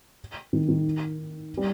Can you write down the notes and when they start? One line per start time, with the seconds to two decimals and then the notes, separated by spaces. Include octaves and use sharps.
0.53 D#3
0.69 D#3
1.57 G3